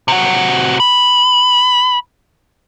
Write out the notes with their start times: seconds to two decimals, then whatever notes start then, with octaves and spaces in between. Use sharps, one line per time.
0.08 C3 F#4
0.80 B5